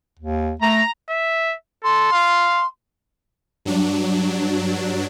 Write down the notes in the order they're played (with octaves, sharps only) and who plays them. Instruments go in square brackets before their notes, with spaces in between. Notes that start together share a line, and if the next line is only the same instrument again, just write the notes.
[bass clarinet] D#2
[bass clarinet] A3 [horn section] A#5
[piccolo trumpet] E5
[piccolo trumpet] A4 [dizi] C6
[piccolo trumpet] F5
[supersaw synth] G2 F#3 D4